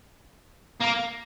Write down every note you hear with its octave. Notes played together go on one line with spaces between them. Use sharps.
A#3